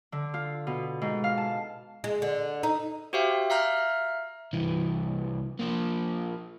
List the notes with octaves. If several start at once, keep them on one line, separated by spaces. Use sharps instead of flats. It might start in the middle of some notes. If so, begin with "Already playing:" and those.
D3
F4
B2
G#2
F5
A5
G#3
D3
D#4
F#4 G4 C5 E5 F5 G5
E5 F5 A#5 F6 G6
C2 E3
F3 A#3